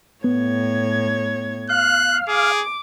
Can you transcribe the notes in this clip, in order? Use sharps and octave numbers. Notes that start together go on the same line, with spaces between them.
A2 B3 C#5 G#6
F5 F#6
G#4 D6